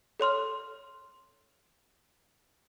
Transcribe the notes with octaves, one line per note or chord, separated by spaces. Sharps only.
A4 C#5 C6 F6